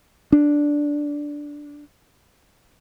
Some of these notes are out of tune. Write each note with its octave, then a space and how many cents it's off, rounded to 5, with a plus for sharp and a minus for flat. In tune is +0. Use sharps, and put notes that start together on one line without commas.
D4 -5